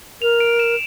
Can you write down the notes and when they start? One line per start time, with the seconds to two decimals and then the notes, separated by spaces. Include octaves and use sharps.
0.22 A#4 F7
0.40 D7
0.59 E7